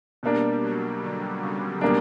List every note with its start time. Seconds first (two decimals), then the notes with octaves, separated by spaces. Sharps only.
0.23 B2 G3 A#3 D4
0.63 F#3
1.02 D3
1.42 C#3
1.81 B2 G3 A#3 D4